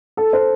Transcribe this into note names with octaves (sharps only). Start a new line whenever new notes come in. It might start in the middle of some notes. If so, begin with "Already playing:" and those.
A4
C5